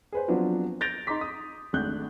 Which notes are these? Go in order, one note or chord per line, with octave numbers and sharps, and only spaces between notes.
G#4 B4 C5
F3 F#3 B3 C4 D4 F4
G6 A6 A#6 D7 F7
D#4 A#5 C6 D6 B6
D#6
G#1 A3 D4 F#6 G6